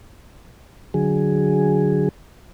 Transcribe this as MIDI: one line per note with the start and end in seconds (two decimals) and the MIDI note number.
0.94 2.09 50
0.94 2.09 54
0.94 2.09 68